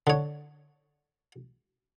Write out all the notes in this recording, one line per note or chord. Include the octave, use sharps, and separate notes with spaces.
D3 C#5